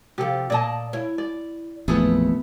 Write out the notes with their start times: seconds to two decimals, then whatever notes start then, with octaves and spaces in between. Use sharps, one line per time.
0.18 C3 F3 G4 A4
0.50 A#2 D5 D#5 A5
0.93 E4 C#5
1.18 D5
1.88 A1 F2 A#2 A3 B3 E4 G#4